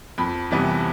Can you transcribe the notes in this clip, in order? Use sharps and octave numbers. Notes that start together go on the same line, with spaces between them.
F2 B5
C3 E3 G3 B3